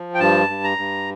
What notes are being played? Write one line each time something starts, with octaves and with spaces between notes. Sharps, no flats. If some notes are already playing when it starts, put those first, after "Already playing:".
Already playing: F3
G5
G2 A5
G2
A#5
G2